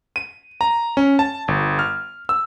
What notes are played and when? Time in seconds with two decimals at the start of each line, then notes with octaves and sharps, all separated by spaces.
0.16 D#7
0.61 A#5
0.97 C#4
1.19 A5
1.48 G1
1.79 F6
2.29 E6